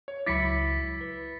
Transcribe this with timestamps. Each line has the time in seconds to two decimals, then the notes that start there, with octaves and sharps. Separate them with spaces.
0.08 C#5
0.26 C#2 F#3 E4 B5 D6 A6 B6 C#7
1.01 B4